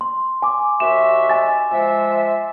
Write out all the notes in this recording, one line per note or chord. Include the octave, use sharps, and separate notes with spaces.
C6
G#5 D6
D#2 F#4 E5 E7
G#5 A6
F3 G#3 E5 G#5